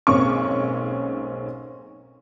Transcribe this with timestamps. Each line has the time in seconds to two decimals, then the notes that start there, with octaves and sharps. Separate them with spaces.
0.07 B1 G#2 A#3 C4 C#4 C#6